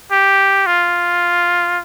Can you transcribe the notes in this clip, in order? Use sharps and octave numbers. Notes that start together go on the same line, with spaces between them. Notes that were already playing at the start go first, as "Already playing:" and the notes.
G4
F4